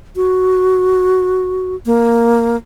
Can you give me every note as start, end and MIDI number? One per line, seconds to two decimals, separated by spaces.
0.16 1.75 66
1.86 2.56 58